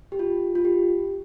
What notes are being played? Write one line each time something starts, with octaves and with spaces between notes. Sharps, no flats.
G4
F4
F4
G4